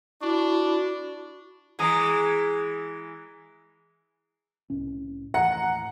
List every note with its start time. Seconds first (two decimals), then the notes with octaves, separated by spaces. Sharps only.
0.22 D4 E4 F#4
1.79 E3 G#3 G#5 A#5 D#6
4.70 C2 A2 C#4
5.34 D#2 A2 E3 F#5 A#5 C#7